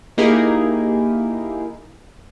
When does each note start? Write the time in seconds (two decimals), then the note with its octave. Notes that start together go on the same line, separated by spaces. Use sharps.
0.18 A#3 D#4 E4 G4 G#4 A#4